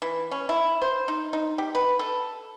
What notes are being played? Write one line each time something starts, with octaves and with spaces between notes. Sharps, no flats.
E3
C#4
E4
C5
D#4
D#4
G4
B4
A4